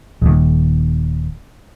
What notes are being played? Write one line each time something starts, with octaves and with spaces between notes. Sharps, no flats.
D#1 D#2